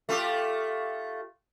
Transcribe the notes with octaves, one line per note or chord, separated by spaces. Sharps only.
A3 F4 G4